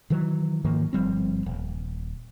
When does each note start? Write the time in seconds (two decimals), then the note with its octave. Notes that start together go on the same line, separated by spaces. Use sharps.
0.10 D#3 E3 F#3
0.65 G#2 D#3 F3 A#3
0.93 G1 F3 G3 C4
1.46 D#1